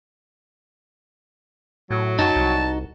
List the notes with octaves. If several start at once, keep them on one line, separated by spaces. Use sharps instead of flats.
A2 F#3
F#2 D#4 F#4 A5
C2